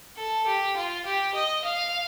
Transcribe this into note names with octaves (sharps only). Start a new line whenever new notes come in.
A4
G4
F4
G4
D#5
F5